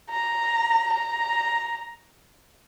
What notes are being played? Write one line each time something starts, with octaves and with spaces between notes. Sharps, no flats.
A#5
A#5